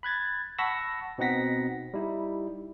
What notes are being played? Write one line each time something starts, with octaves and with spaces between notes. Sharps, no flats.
B5 F#6 G#6 A6
F#5 A5 B5 C#6 E6 A#6
B2 C4 D#4 F#5 A#6 B6
G3 D#4 E4